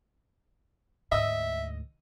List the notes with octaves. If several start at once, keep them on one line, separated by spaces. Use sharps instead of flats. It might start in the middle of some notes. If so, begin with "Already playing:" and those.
D2 G#2 D#5 E5 E6